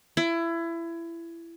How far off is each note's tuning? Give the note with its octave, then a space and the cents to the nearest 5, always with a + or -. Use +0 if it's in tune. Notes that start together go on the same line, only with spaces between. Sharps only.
E4 +25